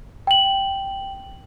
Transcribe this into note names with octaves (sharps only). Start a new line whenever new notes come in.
G5 F#7